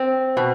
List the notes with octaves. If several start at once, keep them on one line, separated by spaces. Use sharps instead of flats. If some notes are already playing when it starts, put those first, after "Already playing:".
Already playing: C4
B2